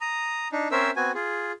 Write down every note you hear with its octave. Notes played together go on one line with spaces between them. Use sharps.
A#5 D#6
D4 D#4
C4 C#4 A#4 C5 E5 E6
B3 C4 F#4 G#5
F4 G#4